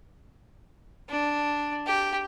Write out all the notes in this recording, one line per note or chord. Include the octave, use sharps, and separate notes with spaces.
D4
G4